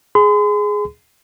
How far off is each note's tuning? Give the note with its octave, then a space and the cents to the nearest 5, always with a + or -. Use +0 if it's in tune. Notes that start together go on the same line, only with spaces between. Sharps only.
G#4 +5 C6 -45